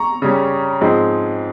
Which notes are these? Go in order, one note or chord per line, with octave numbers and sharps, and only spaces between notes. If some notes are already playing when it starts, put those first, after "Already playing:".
Already playing: A#5 C#6
C#3 G3 C#4
G#2 F3 G#3 C4